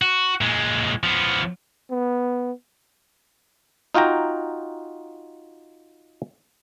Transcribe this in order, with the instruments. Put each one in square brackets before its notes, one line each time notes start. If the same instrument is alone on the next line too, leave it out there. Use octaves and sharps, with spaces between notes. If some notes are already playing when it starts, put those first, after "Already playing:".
[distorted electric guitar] F#4
A#2 G#3
F3 B3
[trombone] B3
[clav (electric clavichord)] D#4 F4 F#4 G5 A#5